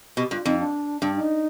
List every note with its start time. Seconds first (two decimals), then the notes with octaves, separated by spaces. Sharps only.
0.16 B2 G4
0.31 G2 F4
0.45 F2 D#4
0.59 D4
1.02 G2 D4
1.16 D#4